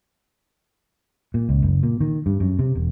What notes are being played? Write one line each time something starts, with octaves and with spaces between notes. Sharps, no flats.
A#2
C#2
F#1
A#2
D#3
G2
F#2
C3
E1